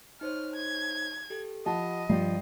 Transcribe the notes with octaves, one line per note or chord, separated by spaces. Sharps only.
D#4 C5 C#5 F6
G#6
G4 A4
F3 G4 D#5 F#5 A5 B5
G2 F3 G4 G5 C7